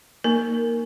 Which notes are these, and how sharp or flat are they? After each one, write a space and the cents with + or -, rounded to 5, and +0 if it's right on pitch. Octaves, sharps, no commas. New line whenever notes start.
A#3 +0 D#4 +0 A#4 -10